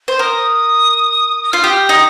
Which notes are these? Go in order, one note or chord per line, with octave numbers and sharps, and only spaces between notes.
C5
A#4 D#6
F4 F6
G4 D#6
D#4